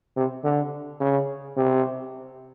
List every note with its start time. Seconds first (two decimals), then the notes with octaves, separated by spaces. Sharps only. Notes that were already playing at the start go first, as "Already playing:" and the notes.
0.17 C3
0.44 D3
1.00 C#3
1.57 C3